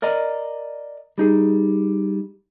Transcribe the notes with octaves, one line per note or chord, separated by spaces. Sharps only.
A#4 D5 D#5 A#5
G3 D#4 G#4